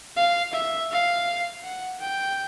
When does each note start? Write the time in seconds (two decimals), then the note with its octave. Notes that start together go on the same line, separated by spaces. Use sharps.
0.16 F5
0.53 E5
0.91 F5
1.63 F#5
2.00 G5